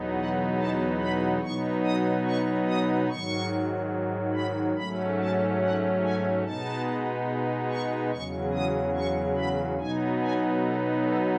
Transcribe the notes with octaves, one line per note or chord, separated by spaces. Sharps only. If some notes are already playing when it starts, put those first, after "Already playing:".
Already playing: E2 B2 F#3 B3 D#4
F#5
A5
B5
B2 F#3 B3 D#4 C#6
D#6
C#6
D#6
G#2 D#3 F#3 C#6
B5
G#2 F#3 A3 C#4 B5
A5
F#5
G#5
B2 G#3 B3 D#4 A5
C#6
E2 C#3 F#3 C#6
D#6
C#6
B5
B2 F#3 B3 D#4 G#5
G#5
A4
A4